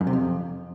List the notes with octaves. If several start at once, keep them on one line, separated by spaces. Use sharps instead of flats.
F#2
C3
F2